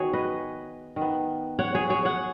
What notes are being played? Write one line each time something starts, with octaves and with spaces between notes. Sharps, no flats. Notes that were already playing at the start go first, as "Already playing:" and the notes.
Already playing: D#3 B3 F#4 G#4 C#5
B4 D#5
D#3 B3
C#5 F#5
G#4 C#5
G#4 C#5
C#5 F#5